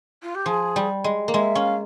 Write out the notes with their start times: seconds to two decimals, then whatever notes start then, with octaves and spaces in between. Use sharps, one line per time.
0.23 F4
0.35 G4
0.46 F3 G#4
0.76 G3
1.04 G#3
1.28 A#3
1.33 G#3 E5
1.55 C#4 F5